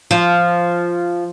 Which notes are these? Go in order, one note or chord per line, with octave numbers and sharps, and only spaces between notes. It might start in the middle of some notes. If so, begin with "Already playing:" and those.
F3